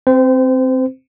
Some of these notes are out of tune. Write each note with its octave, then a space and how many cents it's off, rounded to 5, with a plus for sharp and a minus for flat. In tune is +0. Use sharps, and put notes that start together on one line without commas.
C4 +0 C5 -30